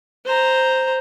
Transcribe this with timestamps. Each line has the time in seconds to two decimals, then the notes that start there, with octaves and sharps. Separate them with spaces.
0.25 C5 A#5